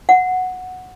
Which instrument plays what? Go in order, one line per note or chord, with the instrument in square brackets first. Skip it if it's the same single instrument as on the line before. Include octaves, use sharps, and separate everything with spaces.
[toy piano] F#5